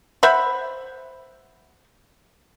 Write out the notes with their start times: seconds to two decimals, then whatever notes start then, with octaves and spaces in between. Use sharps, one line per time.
0.23 C5 E5 F#5 B5